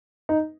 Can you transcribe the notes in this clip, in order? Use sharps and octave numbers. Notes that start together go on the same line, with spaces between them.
D#4